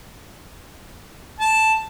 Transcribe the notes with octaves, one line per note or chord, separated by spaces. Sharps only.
A5